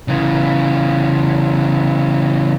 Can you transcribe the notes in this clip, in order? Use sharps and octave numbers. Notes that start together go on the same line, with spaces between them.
C#3 E3